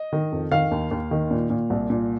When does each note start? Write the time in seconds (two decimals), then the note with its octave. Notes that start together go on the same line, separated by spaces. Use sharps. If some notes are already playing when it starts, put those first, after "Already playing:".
Already playing: D#5
0.13 D#3
0.32 F2
0.52 D#3 F5
0.71 D#2
0.91 D#2
1.11 D#3
1.31 A#2
1.50 A#2
1.70 C2
1.90 A#2